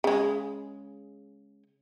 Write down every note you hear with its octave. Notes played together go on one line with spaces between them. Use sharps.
C#3 G#3